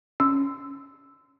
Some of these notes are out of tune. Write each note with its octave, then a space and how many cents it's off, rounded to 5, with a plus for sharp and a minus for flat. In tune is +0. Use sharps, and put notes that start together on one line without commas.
C#4 +0 E6 +0